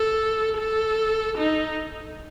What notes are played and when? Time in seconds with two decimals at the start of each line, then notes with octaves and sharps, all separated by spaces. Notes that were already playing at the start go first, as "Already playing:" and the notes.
Already playing: A4
0.57 A4
1.37 D#4